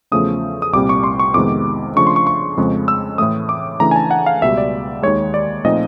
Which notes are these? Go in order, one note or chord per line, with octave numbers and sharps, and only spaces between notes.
E2 C#3 F3 A3 C#4 D#6
D#6
C2 A#2 G3 C4 D6
C#6
C6
C#6
F2 C3 D#3 G#3 B3 D6
C#3 F3 A3 D4 C#6
C6
C#6
C#6
F2 C#3 F3 G#3 C4
E6
A2 E3 A3 D#6
D6
C#3 E3 A3 D4 A#5
G#5
A5
F#5
F5
C#2 B2 G3 E5
D5
D#2 D#3 G#3 C#5
D5
A#2 F3 A3 C4 D#4 D#5